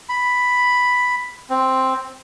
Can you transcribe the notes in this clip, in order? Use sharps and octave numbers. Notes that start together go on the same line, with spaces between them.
B5
C4